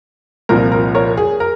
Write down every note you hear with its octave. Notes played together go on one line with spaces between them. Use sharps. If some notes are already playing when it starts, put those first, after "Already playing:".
C2 A#2 F3 A#4
A#4
A#4 C#5
G#4
A#4